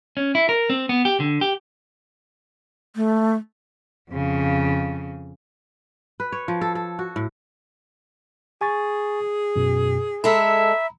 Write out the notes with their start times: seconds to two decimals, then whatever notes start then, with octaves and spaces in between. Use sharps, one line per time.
0.17 C#4
0.35 E4
0.49 A#4
0.70 C4
0.89 B3
1.05 G4
1.20 D3
1.41 G4
2.96 A3
4.11 F2 C#3
6.20 B4
6.32 C#5
6.48 F3
6.61 A4
6.75 A4
6.99 F#4
7.16 A2
8.61 G#4 G#5 C#6 A6
9.56 F#2 B2
10.24 G#3 A4 E5 A#5 B5